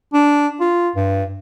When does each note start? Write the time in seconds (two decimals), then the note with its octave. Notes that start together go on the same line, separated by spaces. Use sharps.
0.14 D4
0.60 F4
0.96 G2